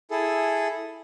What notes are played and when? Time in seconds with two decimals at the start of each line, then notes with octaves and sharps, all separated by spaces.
0.11 E4 G#4 A4